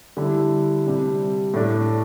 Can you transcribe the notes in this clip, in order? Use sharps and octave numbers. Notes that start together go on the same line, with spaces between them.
D3 G3 E4
C3 G3 D4
A2 A3 D4